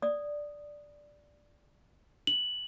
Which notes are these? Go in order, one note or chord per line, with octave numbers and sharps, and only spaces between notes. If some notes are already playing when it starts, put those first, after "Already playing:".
D5 D#6
F#7